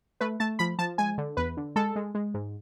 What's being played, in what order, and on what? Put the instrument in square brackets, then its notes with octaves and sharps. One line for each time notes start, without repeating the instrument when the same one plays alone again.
[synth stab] A3 B4
A3 A5
F3 B5
F3 A5
G#3 G#5
D3
E2 B4
D3
G#3 A4
G#3
G#3
G#2